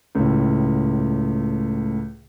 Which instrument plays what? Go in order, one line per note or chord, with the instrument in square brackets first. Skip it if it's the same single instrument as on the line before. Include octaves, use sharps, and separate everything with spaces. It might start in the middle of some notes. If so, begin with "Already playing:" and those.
[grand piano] C#2 A2